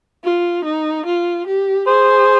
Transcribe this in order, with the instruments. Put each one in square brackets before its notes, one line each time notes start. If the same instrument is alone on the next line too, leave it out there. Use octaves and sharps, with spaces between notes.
[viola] F4
D#4
F4
G4
[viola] G#4 [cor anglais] C5